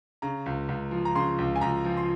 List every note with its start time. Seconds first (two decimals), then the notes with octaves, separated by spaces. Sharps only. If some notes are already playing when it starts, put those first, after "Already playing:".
0.22 C#3 A#5
0.46 C#2
0.69 C#2
0.91 F3
1.05 A#5
1.15 C#3 C6
1.38 C#2
1.56 G#5
1.61 C#2 A#5
1.85 F3
1.97 C6